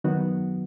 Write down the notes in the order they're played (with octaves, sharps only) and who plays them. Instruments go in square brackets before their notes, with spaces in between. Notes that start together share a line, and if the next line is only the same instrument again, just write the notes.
[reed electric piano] D#3 F#3 B3 D#4 F#4